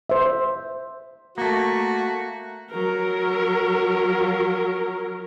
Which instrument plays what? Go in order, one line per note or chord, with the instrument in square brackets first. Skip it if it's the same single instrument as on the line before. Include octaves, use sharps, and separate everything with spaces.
[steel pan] C5 E5
[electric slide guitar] A3 A#3 [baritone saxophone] F#4
[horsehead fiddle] F#3 A#4